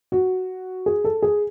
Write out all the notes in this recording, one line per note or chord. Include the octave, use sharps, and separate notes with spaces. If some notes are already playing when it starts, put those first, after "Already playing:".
F#4
G#4
A4
G#4